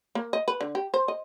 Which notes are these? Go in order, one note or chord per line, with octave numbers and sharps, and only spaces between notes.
A#3
D#5
B4
D3
G4
C5
D#5